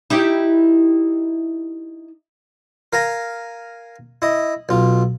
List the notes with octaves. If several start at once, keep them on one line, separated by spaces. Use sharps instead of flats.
D#4 E4 G4
A#4 F5 G#5 A#5
E4 D#5
B1 F4